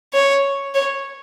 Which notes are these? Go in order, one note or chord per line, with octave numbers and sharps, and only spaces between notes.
C#5
C#5